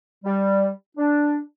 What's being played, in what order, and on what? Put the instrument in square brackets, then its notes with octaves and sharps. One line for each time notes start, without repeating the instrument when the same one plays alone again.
[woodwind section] G3
D4